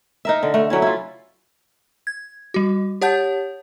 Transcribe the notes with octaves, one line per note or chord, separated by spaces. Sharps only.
D#4 A#4 E5
D3
A3
F#3 C#4 E4
E4 F4
G#6
G3 F#4
G4 C#5 F#5 A5 G6